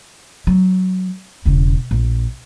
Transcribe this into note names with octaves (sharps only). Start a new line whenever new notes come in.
F#3
E1 C#3
A#1